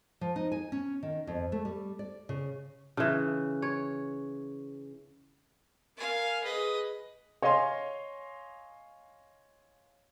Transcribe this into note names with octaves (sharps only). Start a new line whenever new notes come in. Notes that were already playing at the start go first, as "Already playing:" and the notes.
F3
D#4
G#5
C#4
D#3
F2
A3
G3
D5
C#3
C#3 E3
C#5
A#4 F5 G#5
G#4 B4 D#5
C#5 D#5 F5 G#5 C6